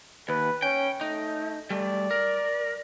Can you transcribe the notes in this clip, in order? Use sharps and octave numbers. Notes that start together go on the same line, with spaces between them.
D#2 B4
C#4 G5
A3 D#4
G3 A3 D5
A#4